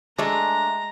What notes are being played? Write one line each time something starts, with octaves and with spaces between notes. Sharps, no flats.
G#3 A3 D4 A#5